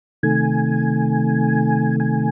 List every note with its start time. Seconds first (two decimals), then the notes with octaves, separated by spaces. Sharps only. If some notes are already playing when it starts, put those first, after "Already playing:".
0.23 C3 D#3 A3 G#5
2.00 G#5